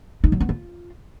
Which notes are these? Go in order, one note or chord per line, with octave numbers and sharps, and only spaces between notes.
D#4
F#3
B3
F4